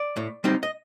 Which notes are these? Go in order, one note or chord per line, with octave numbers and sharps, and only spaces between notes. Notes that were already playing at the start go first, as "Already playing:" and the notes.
Already playing: D5
A2
G3 C4 D#4
D#5